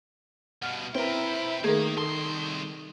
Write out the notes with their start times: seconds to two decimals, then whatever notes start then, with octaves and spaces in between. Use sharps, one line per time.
0.62 G2 B2 F#5 F6
0.95 C4 E4 A#4 B4 E5 G5
1.64 D#3 A3 A#3 G#4 A#4
1.97 C2 A4 C6